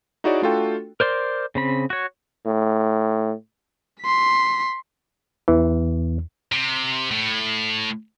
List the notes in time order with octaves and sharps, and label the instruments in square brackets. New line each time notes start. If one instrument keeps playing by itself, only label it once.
[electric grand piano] D#4 E4 F#4 G#4 C#5 D5
A3 D4 F4 F#4 A4 G5
[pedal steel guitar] A#4 C5 D5 C6
C#3 C4 B5
F#4 C#5
[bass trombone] A2
[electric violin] C6 B6
[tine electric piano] E2 [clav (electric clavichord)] E3
[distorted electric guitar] C3
A2